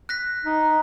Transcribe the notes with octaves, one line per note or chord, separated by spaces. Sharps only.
F#6 A#6 B6
D#4